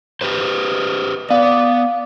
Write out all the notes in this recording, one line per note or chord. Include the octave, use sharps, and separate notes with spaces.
G4 B4 C5
B3 D5 F5